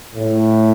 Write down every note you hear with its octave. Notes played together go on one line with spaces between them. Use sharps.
A2